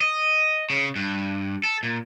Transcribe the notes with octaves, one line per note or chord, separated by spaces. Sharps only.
D#5
C#3
G2
A4
A#2